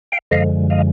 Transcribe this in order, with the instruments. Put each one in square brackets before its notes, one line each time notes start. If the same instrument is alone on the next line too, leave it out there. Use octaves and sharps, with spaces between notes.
[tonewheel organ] F5 G5
F#2 D3 F3 G#3 D#5 F5
D#5 F5